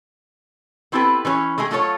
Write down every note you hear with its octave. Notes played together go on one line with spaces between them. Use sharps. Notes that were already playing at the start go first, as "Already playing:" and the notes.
B3 C4 E4 G4 A4 B4
E3 C#4 B4 C#5
G#3 A3 G4 G#4
F#3 A3 F4 A4 B4 C#5